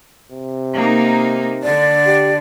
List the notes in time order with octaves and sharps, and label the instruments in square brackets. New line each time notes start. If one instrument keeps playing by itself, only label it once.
[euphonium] C3
[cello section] A#3 D#4
[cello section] D3 [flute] D5
[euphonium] G4